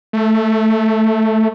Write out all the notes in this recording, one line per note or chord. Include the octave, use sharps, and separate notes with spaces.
A3